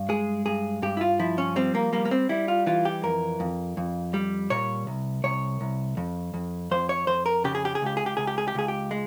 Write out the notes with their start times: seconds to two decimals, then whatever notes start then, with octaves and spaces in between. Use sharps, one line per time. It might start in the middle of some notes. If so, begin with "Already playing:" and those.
Already playing: G2
0.09 G#3 G#4
0.46 G2 G#4
0.82 G2 G4
0.97 E4
1.01 F4
1.19 F3 E4
1.38 C#4
1.56 G3 C4
1.75 A#3
1.93 G3 A#3
2.05 A#3
2.11 C4
2.29 G3 E4
2.48 F4
2.66 E3 F4
2.85 G4
3.03 F2 A#4
3.40 F2
3.77 F2
4.14 G3
4.50 A#2 C#5
4.87 C2
5.24 C2 C#5
5.61 C2
5.97 F2
6.34 F2
6.71 F2 C5
6.89 C#5
7.07 F2 C5
7.26 A#4
7.44 C#3 G4
7.55 G#4
7.65 G4
7.75 G#4
7.82 C#2 G4
7.97 G#4
8.06 G4
8.17 C#2 G#4
8.27 G4
8.38 G#4
8.48 G4
8.55 C#2 G#4
8.68 G4
8.91 G#3